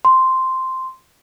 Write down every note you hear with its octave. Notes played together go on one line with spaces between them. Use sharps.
C6